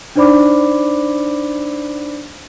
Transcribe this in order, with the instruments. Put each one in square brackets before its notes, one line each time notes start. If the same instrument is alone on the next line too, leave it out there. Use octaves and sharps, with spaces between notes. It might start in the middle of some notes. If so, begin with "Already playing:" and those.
[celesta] D4 D#4 C5 D5 B5 D6